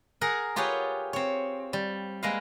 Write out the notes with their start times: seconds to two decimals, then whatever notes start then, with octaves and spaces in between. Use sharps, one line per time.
0.21 G#4 A#4 F#5
0.56 F4 G4 G#4 B4 C#5 F#5
1.13 C4 C#5
1.73 G3
2.23 G#3 A#3 A#4 B4 E5 F5